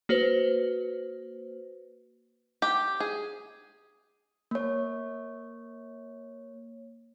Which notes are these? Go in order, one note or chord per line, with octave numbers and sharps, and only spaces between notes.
A#3 F#4 B4 C5
G4
G#4
A#3 C#5